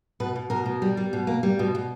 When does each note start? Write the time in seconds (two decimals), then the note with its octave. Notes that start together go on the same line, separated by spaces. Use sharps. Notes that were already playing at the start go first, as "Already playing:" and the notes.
0.20 B2 B4
0.36 B2
0.50 B2 A#4
0.66 B2
0.82 G3
0.97 G3
1.13 B2
1.27 A#3
1.43 G3
1.59 B2
1.75 B2